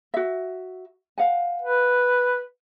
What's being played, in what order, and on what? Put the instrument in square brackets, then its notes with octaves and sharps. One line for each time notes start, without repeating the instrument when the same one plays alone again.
[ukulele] F#4 E5
F5 F#5 G#5
[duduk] B4